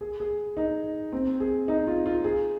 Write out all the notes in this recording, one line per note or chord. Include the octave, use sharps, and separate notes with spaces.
G#4
G#4
D#4
C4
G#4
D#4
F4
F4
G#4